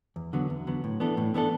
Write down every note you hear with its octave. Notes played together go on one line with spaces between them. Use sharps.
E2
D3 F#3 B3
E2
D3 F#3 B3
A2
E3 B3 D4 A4
A2
E3 B3 D4 A4